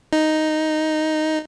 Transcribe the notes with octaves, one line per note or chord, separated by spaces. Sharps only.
D#4